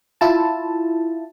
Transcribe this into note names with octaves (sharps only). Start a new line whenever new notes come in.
E4 F4 A5